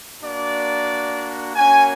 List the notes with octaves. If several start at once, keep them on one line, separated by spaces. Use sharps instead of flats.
A#3 D4 F#4 D5
A#3 C#4 F#4 G#5